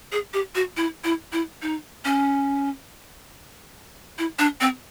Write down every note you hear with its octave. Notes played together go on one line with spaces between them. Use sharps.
G#4
G4
F#4
E4
E4
E4
D#4
C#4
E4
D4
C4